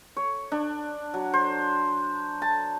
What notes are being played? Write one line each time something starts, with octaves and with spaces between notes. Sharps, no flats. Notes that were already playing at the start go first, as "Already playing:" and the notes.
C#5
D4
F#3
C5
A5